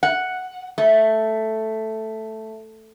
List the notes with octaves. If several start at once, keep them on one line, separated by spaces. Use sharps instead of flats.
F#5
A3